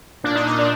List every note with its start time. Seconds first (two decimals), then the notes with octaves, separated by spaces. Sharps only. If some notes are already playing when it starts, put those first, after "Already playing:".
0.24 A#2 D4
0.35 D#4
0.39 A#2
0.47 D#4
0.54 A#2 D4